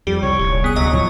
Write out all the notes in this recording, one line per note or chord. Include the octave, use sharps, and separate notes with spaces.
F2 G3 G4
C2 C#5
D#1
B3 G#4 D#6
D2 F#3 D#5 D#6
A2 F3 F#3 C#5